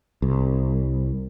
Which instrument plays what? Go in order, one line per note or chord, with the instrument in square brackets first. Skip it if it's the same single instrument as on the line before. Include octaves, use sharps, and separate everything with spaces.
[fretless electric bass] C2